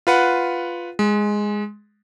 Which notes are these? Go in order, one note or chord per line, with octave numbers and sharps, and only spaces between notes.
F4 B4 F#5
G#3